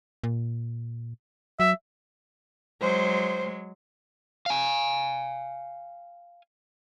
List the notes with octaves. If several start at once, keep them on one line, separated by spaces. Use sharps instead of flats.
A#2
F#3 E5
F#3 G#3 C5
F5 G#5